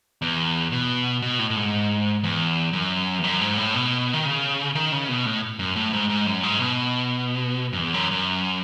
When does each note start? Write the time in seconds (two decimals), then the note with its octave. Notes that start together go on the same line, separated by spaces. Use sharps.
0.22 E2
0.72 B2
1.22 B2
1.39 A2
1.50 A2
1.56 G#2
2.24 E2
2.73 F#2
3.19 E2
3.24 F#2
3.41 G#2
3.57 A2
3.74 B2
4.14 D#3
4.25 C#3
4.75 D#3
4.92 C#3
5.09 B2
5.25 A2
5.59 F#2
5.76 A2
5.93 G#2
6.09 G#2
6.26 F#2
6.43 G#2
6.60 B2
7.73 F#2
7.77 E2
7.94 F#2
8.11 F#2